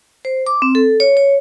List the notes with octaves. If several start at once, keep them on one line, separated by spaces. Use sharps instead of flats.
C5
D6
C4
A4
C#5
C#5